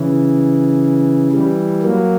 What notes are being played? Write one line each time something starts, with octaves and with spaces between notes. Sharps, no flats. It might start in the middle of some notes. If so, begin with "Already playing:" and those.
Already playing: C#3 E3
E3 G3
F#3 A#3